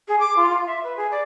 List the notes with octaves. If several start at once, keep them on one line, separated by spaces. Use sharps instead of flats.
G#4
D6
F4
F4
E5
B4
G#4
D5